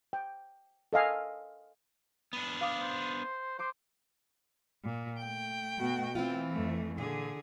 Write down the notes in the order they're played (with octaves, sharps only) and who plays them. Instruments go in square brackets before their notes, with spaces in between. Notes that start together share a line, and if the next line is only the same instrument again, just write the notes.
[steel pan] G5
A4 D#5 F5 G#5
[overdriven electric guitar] B3 D4
[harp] F5 D6 D#6
[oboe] C5
[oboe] C5 [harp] C6 D6 C7
[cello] A#2
A3 G5
[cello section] B2 F#4
[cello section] E3 [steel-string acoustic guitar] C4 E4 F4
[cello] F2 A3
[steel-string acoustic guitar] A#2 [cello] D3 G#4